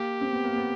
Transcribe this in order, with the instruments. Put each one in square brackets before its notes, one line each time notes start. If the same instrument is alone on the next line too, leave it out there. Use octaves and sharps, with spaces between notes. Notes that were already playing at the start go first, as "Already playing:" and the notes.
Already playing: [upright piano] A#3 [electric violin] G4
[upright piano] C4
B3
A#3
B3